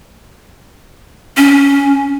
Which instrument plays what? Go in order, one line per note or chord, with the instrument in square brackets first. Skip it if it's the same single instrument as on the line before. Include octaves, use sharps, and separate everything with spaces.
[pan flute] C#4